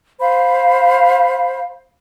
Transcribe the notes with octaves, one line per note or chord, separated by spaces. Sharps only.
C5 F5 B5